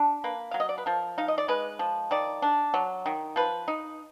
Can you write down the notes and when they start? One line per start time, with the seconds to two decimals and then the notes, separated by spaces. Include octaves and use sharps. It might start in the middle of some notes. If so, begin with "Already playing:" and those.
Already playing: D4
0.24 A#3 B4
0.51 F#3 F5
0.60 D#5
0.69 D5
0.78 B4
0.86 F3 A#4
1.18 D#4 F5
1.28 D#5
1.38 D5
1.48 G#3 B4
1.79 F3
2.11 D#3 D5
2.42 D4
2.74 F#3
3.06 D#3
3.36 F3 B4
3.68 D#4